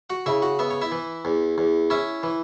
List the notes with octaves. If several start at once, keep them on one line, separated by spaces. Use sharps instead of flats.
F#4 F#5
C#3 E4 E5
F#4 F#5
B3 E5
C#5
E4 E5
E3
E2
E2
C#4 E4 E5
E3